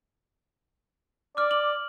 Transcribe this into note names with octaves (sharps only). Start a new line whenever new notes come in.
D5 D6 F6
F#7